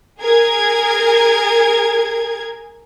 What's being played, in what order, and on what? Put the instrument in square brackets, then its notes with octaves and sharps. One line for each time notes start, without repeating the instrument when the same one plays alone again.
[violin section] G#4 A#4 G#6